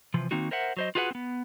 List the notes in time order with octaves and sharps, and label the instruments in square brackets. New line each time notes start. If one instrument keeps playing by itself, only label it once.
[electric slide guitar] C3 E3 F3
D#3 A#3 C4 D#4 F#4
A#4 C5 E5 F#5
F#3 C5 D#5
F4 F#4 G#4 B4 C#5 F#5
B3 C4